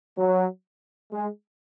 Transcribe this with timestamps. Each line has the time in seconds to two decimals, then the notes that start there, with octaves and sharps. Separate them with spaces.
0.18 F#3
1.13 G#3